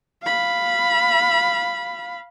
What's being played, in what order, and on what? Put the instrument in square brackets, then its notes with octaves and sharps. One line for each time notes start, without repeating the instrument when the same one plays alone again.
[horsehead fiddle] F5 B5